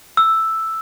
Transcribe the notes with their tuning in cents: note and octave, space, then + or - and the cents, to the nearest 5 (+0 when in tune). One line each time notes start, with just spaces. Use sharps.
E6 +0